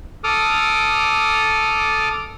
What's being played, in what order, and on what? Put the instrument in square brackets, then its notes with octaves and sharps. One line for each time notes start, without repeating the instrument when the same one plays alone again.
[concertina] A4 D6 D#6 F6